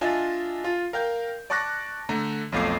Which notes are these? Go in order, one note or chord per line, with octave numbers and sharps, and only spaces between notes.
D4 F4 D#5 E5 G#5 A5
F4
A#4 F5 G5 G6
D5 A5 C#6 D6 F#6 A#6
D3 A3 A#5
B1 F2 A3 F5 D6 C7